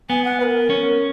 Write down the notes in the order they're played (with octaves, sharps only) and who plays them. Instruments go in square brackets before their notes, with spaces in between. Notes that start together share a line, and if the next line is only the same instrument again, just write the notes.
[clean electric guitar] B3 [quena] G#5
[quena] F#5
B4
A#4
[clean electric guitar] C#4